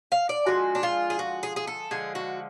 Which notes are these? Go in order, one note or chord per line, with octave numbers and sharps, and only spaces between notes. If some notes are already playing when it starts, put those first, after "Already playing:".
F5
D5
D3 F3 G#3 F#4
D4
F4
G#4
F#4
G#4
G#4
A4
D3 F3 G#3 G#4
F#4